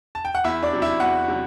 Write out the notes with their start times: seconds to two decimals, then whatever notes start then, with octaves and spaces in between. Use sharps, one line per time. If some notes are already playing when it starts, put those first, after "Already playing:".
0.15 A5
0.25 G5
0.35 F#5
0.44 E2 E4 E5
0.63 D4 D5
0.73 C3 F#3
0.82 E4 E5
1.00 E2 F#4 F#5
1.28 C3 F#3